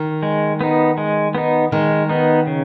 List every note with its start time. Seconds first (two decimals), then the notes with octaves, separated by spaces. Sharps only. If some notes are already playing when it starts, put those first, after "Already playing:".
Already playing: D#3
0.23 G#3
0.61 B3 D#4
0.98 G#3
1.35 B3 D#4
1.72 D#3 G#3
2.09 B3 D#4
2.47 C#3